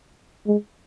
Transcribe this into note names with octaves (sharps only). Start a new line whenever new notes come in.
G#3